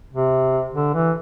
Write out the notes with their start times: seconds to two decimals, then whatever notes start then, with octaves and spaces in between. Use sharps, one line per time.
0.13 C3
0.74 D3
0.93 E3